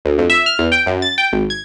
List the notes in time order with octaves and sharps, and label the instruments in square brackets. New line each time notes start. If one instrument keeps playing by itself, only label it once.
[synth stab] D2
F2
E5
F6
E2
G5
F#2
A6
G5
G#1
G#6